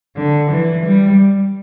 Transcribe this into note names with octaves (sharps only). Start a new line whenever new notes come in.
D3
E3
G3